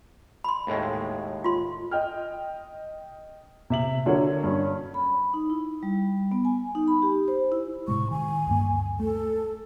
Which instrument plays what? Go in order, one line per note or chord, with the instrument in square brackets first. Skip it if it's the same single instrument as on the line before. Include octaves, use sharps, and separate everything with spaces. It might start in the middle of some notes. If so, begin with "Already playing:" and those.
[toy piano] B5 C6
[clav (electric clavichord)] D#2 A2 G#3
[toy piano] F4 C6
[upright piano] D#5 G5 F6
C3 E5 F#7
D3 F#3 A#4 C#5
G2 C#4
[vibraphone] B5
D#4
E4
G3
B3
G#5
D#4
B5
G4
C5
E4
[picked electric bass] A2 C3 G#3 [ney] C#6
[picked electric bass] D#3 [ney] G#5
[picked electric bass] D2 G2 A#3
[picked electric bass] A3 [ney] A4